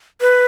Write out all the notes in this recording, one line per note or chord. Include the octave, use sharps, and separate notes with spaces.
B4